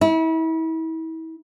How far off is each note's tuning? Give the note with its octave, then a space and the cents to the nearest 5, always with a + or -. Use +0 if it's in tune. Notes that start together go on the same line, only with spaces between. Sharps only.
E4 -35